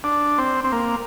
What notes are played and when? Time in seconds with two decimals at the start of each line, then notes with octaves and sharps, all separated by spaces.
0.04 D4
0.38 C4
0.64 C4
0.72 A#3